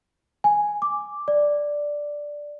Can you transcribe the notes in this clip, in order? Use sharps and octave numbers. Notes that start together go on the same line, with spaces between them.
G#5
D6
D5